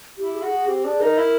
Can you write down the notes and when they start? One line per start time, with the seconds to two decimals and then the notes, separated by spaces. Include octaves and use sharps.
0.18 E4 G4
0.35 G#4
0.43 F#4
0.51 G#4
0.67 C4 G4
0.84 D4 G#4
1.00 D#4 A#4 B4
1.18 E4